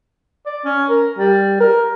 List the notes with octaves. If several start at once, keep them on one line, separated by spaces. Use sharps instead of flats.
D5
C#4
A#4
G3
A#4